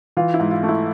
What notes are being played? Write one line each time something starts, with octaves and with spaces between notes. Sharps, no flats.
E3 F4
E4
G#2
F4
A3
E4